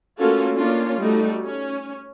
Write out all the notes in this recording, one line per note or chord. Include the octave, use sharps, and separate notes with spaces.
A3 A#3 C#4 F4 F#4 A4
A#3 C#4 D4 F4
G3 A3 D#4 F#4
C#4